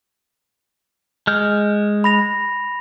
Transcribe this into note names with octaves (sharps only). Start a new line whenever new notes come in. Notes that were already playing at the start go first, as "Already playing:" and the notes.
G#3 F6 G6
B5 A#6 F7